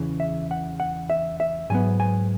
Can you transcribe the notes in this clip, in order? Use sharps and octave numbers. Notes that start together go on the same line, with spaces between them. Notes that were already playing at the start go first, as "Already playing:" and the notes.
Already playing: E2 C#3 E3
E5
F#5
F#5
E5
E5
G#2 F#3 B3 G#5
G#5